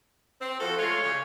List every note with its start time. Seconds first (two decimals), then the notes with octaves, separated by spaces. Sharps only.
0.41 C4
0.60 F3 F#4 A4
0.78 G#3 A3 F4 C#5
1.02 A#2 C#3